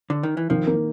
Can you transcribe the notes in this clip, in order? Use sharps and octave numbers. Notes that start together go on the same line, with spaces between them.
D3
D#3
E3
D#3 F3
A#3